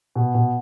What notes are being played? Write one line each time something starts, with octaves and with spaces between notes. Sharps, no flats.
B2
B2